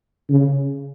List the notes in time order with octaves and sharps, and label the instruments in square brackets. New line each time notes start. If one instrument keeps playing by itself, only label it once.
[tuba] C#3